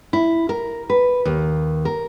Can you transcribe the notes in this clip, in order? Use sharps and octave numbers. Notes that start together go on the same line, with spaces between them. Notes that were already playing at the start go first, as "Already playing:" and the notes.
E4
A#4
B4
D#2
A#4